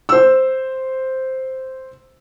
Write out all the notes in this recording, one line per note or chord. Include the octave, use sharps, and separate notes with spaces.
C5 E6